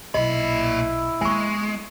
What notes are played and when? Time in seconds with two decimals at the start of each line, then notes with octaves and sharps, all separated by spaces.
0.14 B1 A#2 E4 D#5 B5
1.21 G#3 A#3 B3 G#5 C#6